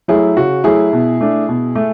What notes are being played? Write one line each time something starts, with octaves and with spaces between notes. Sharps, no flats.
F#3 A3 E4 G#4
C#3 F#4
F#3 A3 E4 G#4
B2
A3 D4
B2
A3